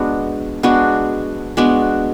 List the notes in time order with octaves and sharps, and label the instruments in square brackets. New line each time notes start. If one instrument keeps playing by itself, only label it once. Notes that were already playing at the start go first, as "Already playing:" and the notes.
Already playing: [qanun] G#3 B3 D4 F#4
G#3 B3 D4 F#4
G#3 B3 D4 F#4